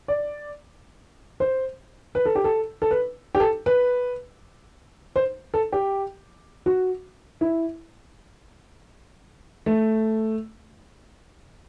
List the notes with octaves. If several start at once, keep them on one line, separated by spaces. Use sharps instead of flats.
D5
C5
B4
A4
G4
A4
A4
B4
G4
A4
B4
C5
A4
G4
F#4
E4
A3